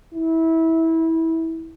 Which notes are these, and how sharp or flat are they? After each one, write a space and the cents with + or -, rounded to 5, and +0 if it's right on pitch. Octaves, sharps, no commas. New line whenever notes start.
E4 -20